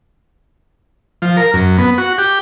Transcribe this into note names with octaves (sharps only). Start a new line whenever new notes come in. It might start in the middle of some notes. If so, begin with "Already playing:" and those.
F3
A#4
F#2
B3
F#4
G4